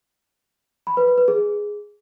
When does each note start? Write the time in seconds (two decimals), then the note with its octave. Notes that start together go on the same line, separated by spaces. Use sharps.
0.87 B5
0.97 B4
1.07 B4
1.18 B4
1.28 G#4